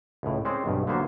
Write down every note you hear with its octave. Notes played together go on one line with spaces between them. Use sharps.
C#2 A2
G#3 C4 C#4 C5 D5
B1 G2
D3 F#3 A#3 B3 C5